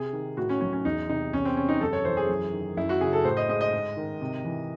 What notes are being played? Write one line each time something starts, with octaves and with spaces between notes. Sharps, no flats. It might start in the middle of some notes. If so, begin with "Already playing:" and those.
Already playing: C3 G#4
D#3
A2 F#4
C#4
F#3 C#4
C#4
E2 D#4
C3 D#4
E2 C#4
C4
C3 C#4
D#4
F#2 A4
C#5
E3 C5
G#4
F#2
D#3
F#2 E4
F#4
C#3 G#4
A4
A2 C5
D#5
G#3 D#5
D#5
G#2
D#3
C3
E3